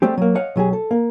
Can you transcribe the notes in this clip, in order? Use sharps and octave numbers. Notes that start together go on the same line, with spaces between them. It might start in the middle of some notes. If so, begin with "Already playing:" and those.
G3 A3 C4 G4
F#3 A#3
C#5 D#5 F5 F#5
B1 F#3 G4 G#4
A4
A#3